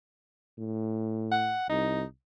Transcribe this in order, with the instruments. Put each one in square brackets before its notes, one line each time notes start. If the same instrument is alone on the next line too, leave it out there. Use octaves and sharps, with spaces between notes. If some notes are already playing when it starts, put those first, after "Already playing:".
[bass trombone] A2
[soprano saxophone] F#5
[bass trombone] C2 [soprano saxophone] D#4